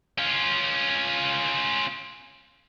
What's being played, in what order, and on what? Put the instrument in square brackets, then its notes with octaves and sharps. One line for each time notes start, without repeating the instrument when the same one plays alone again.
[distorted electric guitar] C#4 F4